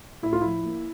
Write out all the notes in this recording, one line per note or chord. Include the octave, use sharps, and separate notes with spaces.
A2 E4
F4
F3 E4
A#3